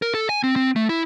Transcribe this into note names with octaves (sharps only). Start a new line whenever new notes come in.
A#4
A4
G#5
C4
C4
A3
E4